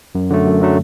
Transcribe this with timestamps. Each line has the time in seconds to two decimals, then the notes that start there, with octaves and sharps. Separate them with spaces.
0.15 F#2
0.30 D3 F#3 A3
0.46 F#2
0.61 D3 F#3 A3